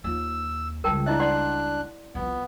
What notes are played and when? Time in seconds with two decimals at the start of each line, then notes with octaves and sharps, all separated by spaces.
0.04 D#2 F4 E6
0.84 C#2 G3 A#4 G5 A5
1.06 D4 E4 D#5 E5 F#6
1.20 D5 F#5 C6
2.15 C2 F3 B3